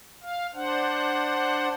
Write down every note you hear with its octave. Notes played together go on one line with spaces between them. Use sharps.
F5
D4 C5 F#5